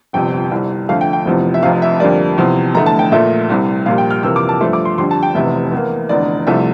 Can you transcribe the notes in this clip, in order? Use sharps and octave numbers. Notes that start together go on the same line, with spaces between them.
G1 F2 C3 G5
C2 C3 G3
F2 D3 A3 F5
G5
G5
F1 E2 C3 F3
E5
F1 F2 C3 F5
E5
F2 D3 G3 A#3 D5
E2 C3 F3
F1 E2 D3 A3 A#5
A5
G5
A#1 A#2 A3 E5
C2 C3 G3
A#1 A#2 G3 F5
G5
F6
F2 C3 E3 A#3 E6
D6
A5
G2 F3 A3 C6
D6
C6
F2 D3 G3 C6
A5
G5
F1 E2 C3 E3 E5
E2 E3 A#3
F1 E2 D3 D5
C2 C3 F3 A3 E5